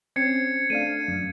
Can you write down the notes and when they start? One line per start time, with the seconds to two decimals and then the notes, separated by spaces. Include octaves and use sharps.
0.16 C4 C#4 G#6 C7 C#7
0.70 A3 D4 F5 D#7
1.08 F#2